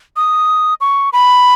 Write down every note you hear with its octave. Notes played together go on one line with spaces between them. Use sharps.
D#6
C#6
B5